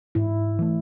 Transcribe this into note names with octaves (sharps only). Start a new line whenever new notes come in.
G#2 E4
E3 A3